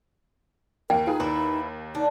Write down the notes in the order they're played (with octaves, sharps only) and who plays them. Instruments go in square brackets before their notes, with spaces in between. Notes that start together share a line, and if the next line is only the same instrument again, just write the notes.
[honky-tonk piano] D#2 A#3 [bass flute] A#4 [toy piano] G5
[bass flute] D#4 [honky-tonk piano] F4 G#4 B4
[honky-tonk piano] D#2 [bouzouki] E4 B4
[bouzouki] D4 [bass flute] D#4